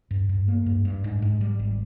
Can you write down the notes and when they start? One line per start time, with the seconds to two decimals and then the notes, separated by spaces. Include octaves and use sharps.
0.11 G2
0.29 G2
0.48 A#3
0.66 G2
0.85 G2
1.04 G#2
1.22 G#2
1.41 G3
1.59 G#1